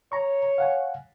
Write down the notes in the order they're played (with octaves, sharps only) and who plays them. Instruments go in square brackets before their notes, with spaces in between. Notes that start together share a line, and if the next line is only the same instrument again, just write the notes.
[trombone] C#5 [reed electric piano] A#5 C#6
[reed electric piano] F5 F#5 G#5